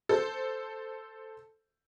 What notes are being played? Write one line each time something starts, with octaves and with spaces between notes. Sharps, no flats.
A4 C5